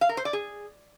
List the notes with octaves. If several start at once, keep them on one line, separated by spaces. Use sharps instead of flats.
F5
A#4
C5
D5
G#4